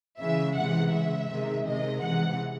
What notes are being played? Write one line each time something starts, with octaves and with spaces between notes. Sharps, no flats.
C#3 E3 G#3 E5
C3 E3 G#3 F#5
C#3 G#3 E5
C3 D#3 G#3
C3 D#3 G#3 D#5
C3 E3 G#3 F#5